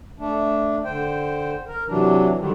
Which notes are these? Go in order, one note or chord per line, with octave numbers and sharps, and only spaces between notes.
A3 D4
D3 C5 G5
A#4
C3 E3 F#3 D4
D3 D#3 F#3 G3